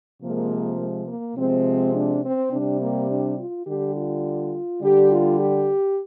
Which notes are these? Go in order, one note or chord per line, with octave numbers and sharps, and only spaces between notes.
C3 F3 G#3 A#3
G#3
A#3
C3 F3 G#3 C4
D4
C4
C3 G3 D4
A#3
D4
F4
D3 G3 G4
F4
D3 G3 G4
F4
G4